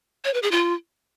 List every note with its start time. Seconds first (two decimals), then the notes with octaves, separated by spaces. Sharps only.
0.25 C#5
0.34 B4
0.43 G#4
0.51 F4